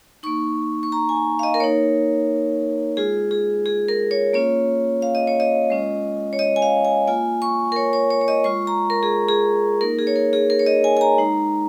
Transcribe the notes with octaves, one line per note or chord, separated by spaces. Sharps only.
A#3 D#4 C#6
C#6
A#5
G#5
F5
D#5
A#4
A#3 D#4 C#5
G#3 F4 G#4
G#4
G#4
A#4
C#5
A#3 C#4 F4 C#5
F5
D#5
C#5
D#5
G#3 C#4 F4
C#5
D#5
G#5
F5
G#5
A#3 F4 G#5
C#6
A#4
C#5
C#5
C#5
C#5
D#5
G#3 F4 C#6
A#5
A#4
G#4
G#4
A#3 D#4 A#4
G#4
C#5
A#4
G#4
A#4
C#5
D#5
G#5
G#5
A#5
G#3 D#4